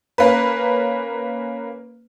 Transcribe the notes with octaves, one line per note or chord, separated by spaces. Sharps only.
A#3 C#4 B4